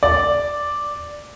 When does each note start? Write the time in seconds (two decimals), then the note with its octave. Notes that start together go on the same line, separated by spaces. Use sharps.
0.03 D5